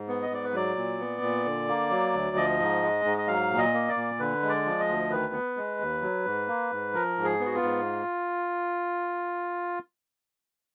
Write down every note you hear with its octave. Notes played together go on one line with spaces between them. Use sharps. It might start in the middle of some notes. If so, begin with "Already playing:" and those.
Already playing: G#2
B3
D#5
G#2 D5
B4
F#3 D5
A#2
B3
A#2
D3
A#3
F#3
D2
F3 D#5
G#2
G#3
G#2
D#5
F#3 F5
A#2
D#5
A#3
D5
A#2
D3 B4
G#3
D5
F3
D#5
D2
D#3 B4
B3
G#3
D#2
F#3
G#2
A#3
G#2
F3 A#4
G#2
G#4
B3
F#4
F4
G#2